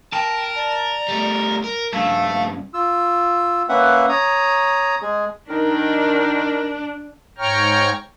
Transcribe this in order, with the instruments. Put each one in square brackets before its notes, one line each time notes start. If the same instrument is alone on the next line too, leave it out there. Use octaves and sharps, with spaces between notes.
[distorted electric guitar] A#4 [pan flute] G5 [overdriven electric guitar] A5
[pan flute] D5
[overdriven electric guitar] G3 A3
A#4
[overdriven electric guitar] G2 C#3 [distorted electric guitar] A3 [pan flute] F5
[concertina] F4 E6
A#3 C#4 B4 E5 F#5
C#5 A#5 D#6
G#3 G#4
[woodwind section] D#3 D#4 A#4 [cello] D4
[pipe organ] G#2 C#5 G5 A#5 C#6 F6